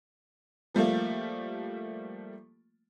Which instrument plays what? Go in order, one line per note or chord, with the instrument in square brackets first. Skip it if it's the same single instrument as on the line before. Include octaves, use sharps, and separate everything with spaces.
[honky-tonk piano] F3 G3 A3 A#3